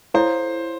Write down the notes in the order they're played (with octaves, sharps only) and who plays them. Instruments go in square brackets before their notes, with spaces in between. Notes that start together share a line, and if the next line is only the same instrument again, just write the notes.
[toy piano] E4 A4 C#5 F5 [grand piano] C5